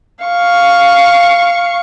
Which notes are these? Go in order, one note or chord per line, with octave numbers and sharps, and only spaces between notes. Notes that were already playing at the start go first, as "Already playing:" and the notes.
F5 C#6